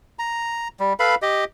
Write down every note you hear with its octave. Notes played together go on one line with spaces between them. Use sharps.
A#5
G3
A4 B4 F5 B5
G4 D#5